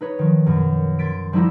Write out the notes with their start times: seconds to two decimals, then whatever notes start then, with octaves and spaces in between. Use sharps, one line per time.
0.01 D#4 B4 C#5
0.19 D#3 F3
0.46 F#2 B2
0.99 C6 G#6 A6 B6 D7
1.32 F3 G3 A#3 D#4 E4 F#4